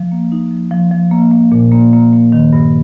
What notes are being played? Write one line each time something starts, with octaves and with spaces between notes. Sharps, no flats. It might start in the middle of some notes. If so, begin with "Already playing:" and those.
Already playing: F3
A#3
D#4
F3
F3
F3
A#3
A#3
A#2
A#3
A#3
A#3
D#3
G2